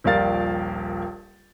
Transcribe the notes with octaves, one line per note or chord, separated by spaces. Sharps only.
D#1 A#1 G3 A#4 F5 A6